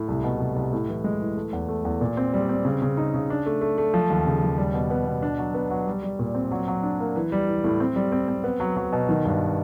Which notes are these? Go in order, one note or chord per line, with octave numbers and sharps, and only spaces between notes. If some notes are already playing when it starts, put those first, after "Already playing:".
Already playing: A2
C2
B2
C2
C2
A2
E3
G#3
E3
A3
E2
A3
E2
A#2
C4
G3
C4
C#3
C#3
D#4
C#3
D4
A3
A3
A3
F3
D#2
C#3
D#2
G3
B2
B3
B2
D4
F#3
B3
F#3
G3
G3
A#2
C4
F#3
F#3
D4
A#3
E3
G3
E3
A2
C4
G3
C4
C4
B3
F#3
F#3
B2
D#3
G2